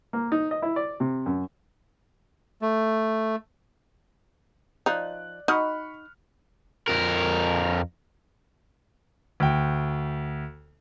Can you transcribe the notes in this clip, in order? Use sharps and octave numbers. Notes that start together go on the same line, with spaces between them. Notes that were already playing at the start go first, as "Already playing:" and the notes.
A#3
D#4
D#5
E4
D5
C3
F#2
A3
F3 D#4 D5 F#6
D#4 F#4 D#5 B5 C#6 F6
F2 A#4
D2 G5